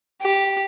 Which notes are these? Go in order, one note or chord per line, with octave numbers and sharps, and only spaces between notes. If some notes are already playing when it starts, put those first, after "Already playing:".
G4